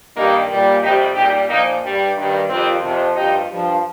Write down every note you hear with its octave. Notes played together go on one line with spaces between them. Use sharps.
G2 D#3 G3 A#3 D#4
A#2 G3
F2 C3 G3 D#4 G4
A#2 G3 D#4 G4
A#2 F3 A#3 D#4
G2 G3
G2 D#3 G3
F2 D#3 G3 C4 F4
F2 C3 F3
G2 F3 D#4 G4
G2 F3